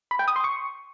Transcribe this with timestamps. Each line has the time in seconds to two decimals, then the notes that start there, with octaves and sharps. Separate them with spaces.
0.11 B5
0.19 G5
0.28 D#6
0.36 C6
0.44 C#6